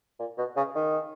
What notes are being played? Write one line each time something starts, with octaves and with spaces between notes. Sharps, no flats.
A#2
B2
C#3
D#3